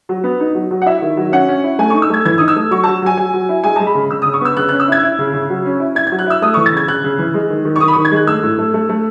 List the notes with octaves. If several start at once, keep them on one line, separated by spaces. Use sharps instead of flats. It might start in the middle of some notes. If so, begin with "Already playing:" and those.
F#3
B3
D#4
F#3
F#3
F#5
E4 E5
D#3
F#3
C#4 F#5
C#4
E4
A3 G#5
D#4 C#6
E6
A3 G#6
E3 G#6
D#4 D#6
E6
A3
F#3 C#6
F#3 A5
F#3 G#5
F#3 G#5
F#3
E4
G#3 G#5
G#3 A5
B5
C#3
C#3 E6
C#3 D#6
C#6
B3 E6
C#3 F#6
C#4 F#6
E6
E4 G#6
E4
C#3
C#3
F#3
C#4
E4
E4 G#6
F#3 G#6
F#6
E4 E6
A3 D#6
E3 C#6
A6
C#3 G#6
C#3 F#6
C#3
E3
G#3
D#3
D#3
C#6
D#3 D#6
B5
D#3 C#6
G#6
G#3 F#6
A3 E6
A2
A3
A3
A3